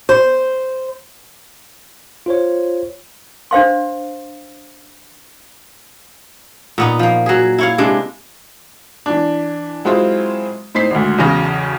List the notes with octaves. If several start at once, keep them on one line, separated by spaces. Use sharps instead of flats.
C5
F4 C5 C#5
D4 C5 F5 C6
A#2 B3 D#4
F3 A#3
F#3 G#4
E4 C#5 F5
C3 G#3 D4
E3 D4
F#3 G#3 C4 E4 F4 G#4
A2 C4 D#4 B6 C7
G#1 D2
B1 E2 C#3 C#4 A#6